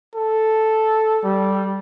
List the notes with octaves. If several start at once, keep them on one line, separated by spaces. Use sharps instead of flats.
A4
G3